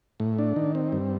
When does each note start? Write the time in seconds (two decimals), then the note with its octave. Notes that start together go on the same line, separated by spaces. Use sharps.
0.20 A2
0.38 D4
0.56 D#3
0.75 C4
0.92 G2